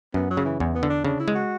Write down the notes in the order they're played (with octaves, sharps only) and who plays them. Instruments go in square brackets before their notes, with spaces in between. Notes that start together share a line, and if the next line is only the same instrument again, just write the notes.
[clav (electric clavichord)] F#2 [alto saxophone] B3
[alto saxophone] F#3
[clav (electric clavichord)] C#3
[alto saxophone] E3
[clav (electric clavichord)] E2 [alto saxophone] E3
[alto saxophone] B3
[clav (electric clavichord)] D3
[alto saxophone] D4
[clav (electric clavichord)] C#3 [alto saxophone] D4
[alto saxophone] E4
[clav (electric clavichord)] G#3
[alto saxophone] F#4